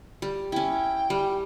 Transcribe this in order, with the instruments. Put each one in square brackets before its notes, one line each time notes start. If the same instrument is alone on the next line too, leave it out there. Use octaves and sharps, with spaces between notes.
[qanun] G3
[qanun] C#4 E4 [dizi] G5
[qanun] G3